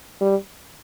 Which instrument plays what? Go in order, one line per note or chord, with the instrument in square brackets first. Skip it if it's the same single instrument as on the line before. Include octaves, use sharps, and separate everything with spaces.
[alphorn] G3